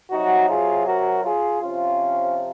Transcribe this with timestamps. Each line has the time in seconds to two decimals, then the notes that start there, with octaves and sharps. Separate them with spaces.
0.11 C3 F#3 D#4 F#4
0.49 F4 G#4
0.86 F#4 A#4
1.24 F4 G#4
1.61 C3 F3 C#4 F4